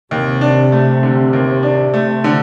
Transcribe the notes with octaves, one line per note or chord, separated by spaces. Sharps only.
D#2 C3
D4
A3
D3
D#2
D4
A3
D3